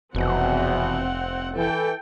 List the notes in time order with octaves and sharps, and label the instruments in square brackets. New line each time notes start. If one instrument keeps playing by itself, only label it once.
[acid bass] F1 [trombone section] E2 B2 [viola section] C4 F#5
[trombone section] E3 [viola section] A4 G5